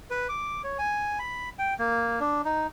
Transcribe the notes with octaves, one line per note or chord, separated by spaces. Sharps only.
B4
D6
C#5
G#5
B5
G5
A#3
D4
D#4